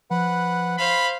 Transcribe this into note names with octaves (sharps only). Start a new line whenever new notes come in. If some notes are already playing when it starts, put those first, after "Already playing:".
F3 B4 F#5
C5 F5 B5